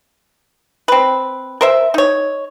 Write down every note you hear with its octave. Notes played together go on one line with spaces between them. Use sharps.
C4 B4
A#4 C5 E5
D#4 C#5